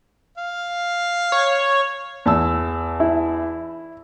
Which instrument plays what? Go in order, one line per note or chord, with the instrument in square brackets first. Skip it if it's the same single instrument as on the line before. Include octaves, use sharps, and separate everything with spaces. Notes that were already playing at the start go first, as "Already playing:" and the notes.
[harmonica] F5
[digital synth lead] C#5
[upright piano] E2 A5 E6
[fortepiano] E4